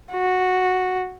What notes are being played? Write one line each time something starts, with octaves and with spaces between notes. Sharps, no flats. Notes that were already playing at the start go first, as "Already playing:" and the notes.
F#4